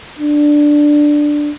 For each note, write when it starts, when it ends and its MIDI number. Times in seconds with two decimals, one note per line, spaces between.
0.19 1.51 62